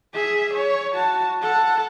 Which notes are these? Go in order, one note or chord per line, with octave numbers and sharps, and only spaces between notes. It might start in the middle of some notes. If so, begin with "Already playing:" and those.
G#4 E5
C#5
F#4 A5
A4 F#5